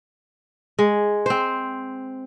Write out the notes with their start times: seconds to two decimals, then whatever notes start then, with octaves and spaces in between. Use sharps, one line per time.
0.79 G#3
1.26 C4 C5